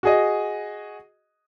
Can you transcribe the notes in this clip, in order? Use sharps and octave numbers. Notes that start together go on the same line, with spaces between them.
F#4 G#4 D#5